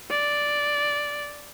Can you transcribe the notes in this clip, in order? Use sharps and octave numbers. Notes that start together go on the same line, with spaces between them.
D5